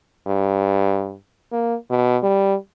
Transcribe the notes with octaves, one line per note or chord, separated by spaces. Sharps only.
G2
A#3
B2
G3